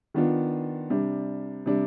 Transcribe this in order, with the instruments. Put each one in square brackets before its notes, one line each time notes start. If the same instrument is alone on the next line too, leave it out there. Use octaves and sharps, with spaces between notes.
[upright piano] D#3 B3 D4 F4
C3 G3 D4
C3 G3 D4